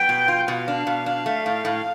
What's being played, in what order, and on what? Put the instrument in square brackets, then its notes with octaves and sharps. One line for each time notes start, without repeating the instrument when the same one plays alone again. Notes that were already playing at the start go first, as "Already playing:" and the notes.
Already playing: [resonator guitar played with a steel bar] B3 [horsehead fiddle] G5
[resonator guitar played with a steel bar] B2
F4
[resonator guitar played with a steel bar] B2 [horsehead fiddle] F5
[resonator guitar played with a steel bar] D4
B2
D4
A3
A2
A2